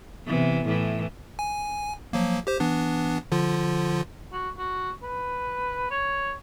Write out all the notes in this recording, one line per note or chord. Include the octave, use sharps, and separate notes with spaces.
C3 E3 B3
A2 E3
G#5
F3 F#3 A#3
G4 C5
E3 B3 D4
D3 F3 F4
F#4
F#4
B4
C#5